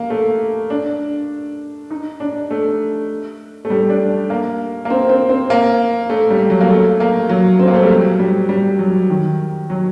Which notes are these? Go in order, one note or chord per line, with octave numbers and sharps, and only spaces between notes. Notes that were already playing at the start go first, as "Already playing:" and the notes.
Already playing: A#3
A3
D4
D#4
D4
A3
A3
G3
D4
A#3
A#3
C4
C4
C4
A#3
A3
G3
F#3
A#3
A3
A#3
F#3
C4
A#3
A3
G3
F#3
G3
G3
F#3
D#3
F#3